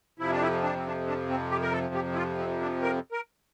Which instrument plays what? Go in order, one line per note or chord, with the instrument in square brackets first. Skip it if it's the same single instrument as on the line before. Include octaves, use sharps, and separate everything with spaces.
[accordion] F2 C3 F3 E4
D4
E4
D4
C4
D4
D4
C4
G4
A#4
A4
G4
E4
F4
C4
D4
A#4
A#4